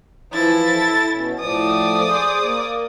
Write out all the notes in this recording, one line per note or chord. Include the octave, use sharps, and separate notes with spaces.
E3 F3 E4 A6
A4
B2 C#4
A2 F3 D5 D#6
G#4 C5
A#3